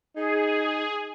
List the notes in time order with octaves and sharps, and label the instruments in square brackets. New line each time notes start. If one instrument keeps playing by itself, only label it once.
[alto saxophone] D#4 [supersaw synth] G#4